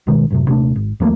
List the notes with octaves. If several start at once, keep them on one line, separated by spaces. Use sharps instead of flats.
B1 B2 D#3 G#3
A1 F#2 C3
D#1 C3 A3 D4
G#1
D#2 F3 A3 A#3